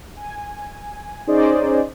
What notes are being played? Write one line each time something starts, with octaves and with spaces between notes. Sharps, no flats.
G#5
C#4 D#4 G#4 C5 D5 D#5